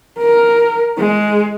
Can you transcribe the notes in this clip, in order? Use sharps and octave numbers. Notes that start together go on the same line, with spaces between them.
A#4
G#3